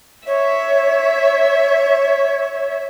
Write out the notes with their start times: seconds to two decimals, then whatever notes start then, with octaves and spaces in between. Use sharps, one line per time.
0.27 C#5 E5